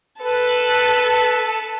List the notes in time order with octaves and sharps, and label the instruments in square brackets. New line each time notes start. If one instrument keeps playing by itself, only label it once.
[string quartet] A4 A5 [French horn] B4